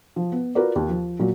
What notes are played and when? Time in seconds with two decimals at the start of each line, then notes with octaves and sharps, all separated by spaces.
0.16 F3
0.32 B3
0.55 F4 F#4 A#4 B4 D5
0.76 D#2
0.89 F3
1.19 A#2 F#3